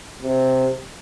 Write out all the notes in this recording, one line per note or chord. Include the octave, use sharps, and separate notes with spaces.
C3